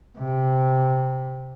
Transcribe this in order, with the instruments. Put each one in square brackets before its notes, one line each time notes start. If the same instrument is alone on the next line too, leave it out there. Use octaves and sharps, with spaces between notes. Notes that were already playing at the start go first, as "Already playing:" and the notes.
[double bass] C3